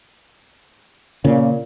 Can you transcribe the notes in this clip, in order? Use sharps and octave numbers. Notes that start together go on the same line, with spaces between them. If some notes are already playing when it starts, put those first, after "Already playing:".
A#2 C#3